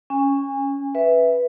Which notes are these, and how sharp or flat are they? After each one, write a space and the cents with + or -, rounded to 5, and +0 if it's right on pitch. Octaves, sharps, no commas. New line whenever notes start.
C#4 +0 G#5 -30
B4 +0 E5 +0